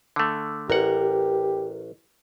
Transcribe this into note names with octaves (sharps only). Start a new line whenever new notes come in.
D3 A3
A1 G4 A#4 F#5